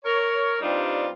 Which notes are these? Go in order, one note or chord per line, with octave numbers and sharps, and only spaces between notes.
A#4 C#5
G2 G3 C4 D4 D#4 F4